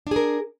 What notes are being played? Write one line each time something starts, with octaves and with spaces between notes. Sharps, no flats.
D4 G#4 A#4